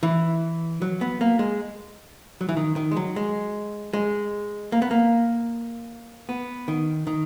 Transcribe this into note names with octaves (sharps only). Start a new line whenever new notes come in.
E3
F#3
B3
A#3
G#3
F#3
E3
D#3
D#3
G#3
F#3
G#3
G#3
A#3
B3
A#3
B3
D#3
D#3